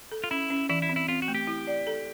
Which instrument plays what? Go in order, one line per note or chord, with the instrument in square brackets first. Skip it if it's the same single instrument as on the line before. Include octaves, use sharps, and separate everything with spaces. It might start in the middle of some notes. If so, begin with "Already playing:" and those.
[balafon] A4
[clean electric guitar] F4
[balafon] C#4 [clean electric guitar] E4
[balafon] C#4
[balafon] E3 [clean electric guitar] E4
[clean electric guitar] E4
[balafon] C4
[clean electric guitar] E4
[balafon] C4 [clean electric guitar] F4
[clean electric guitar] F#4
[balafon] A3
[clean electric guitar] G4
[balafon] E4
D5
A4